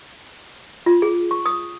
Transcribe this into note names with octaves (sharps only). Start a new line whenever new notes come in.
F4
G#4
C#6
D#6